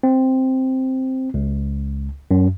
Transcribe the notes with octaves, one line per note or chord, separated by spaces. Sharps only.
C4
C#2
F#2